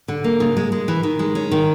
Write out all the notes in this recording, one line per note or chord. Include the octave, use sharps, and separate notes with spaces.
D3
A#3
C#3
G#3
G#3
E3
D#3
G#3
C#4
D#3